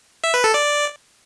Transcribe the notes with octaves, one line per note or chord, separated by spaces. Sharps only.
E5
B4
A4
D5